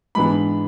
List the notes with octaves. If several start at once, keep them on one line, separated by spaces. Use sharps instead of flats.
G#2 E3 B3 D4 B5